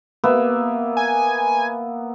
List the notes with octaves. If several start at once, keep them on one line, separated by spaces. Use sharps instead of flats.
A#3 B3 E5
G#5